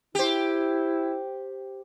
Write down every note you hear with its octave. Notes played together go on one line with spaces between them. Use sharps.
E4 G4 C5